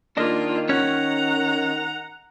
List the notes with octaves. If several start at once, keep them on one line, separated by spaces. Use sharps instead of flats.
D#3 A#3 D4 F4 D#5
C#4 C#5 F#5 A#5